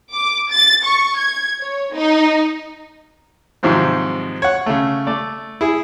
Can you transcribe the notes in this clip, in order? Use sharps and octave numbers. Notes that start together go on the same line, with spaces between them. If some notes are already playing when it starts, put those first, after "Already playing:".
D6
A6
C#6
G#6
C#5
D#4
G#2 C3 D#3 F3 F#3 C4
C#5 F#5
C#3 A3
A3 D5
E4 G#4